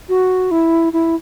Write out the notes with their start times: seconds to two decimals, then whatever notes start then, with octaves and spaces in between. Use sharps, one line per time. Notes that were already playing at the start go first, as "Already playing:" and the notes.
0.09 F#4
0.51 E4
0.93 E4